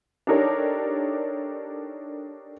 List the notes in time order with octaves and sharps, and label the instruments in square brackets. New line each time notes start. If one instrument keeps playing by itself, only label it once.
[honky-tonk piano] D4 D#4 G4 A4 A#4 C#5